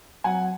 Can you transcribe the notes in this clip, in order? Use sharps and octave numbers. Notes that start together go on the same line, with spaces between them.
F#3 F#5 G#5